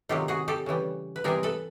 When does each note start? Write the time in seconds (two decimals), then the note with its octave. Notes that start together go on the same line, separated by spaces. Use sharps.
0.09 C3 D#3 F#3 A3 F4 G4
0.28 F#4 G#4
0.48 G4 A4
0.66 C#3 E3 G3
1.16 B4
1.24 C3 E3 G3 G#4 A#4
1.43 A4 B4